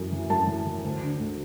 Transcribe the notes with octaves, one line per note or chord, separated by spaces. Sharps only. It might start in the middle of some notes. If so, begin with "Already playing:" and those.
Already playing: F#2 E3
E3
F#2 A5
E3
E3
D2
D3
D2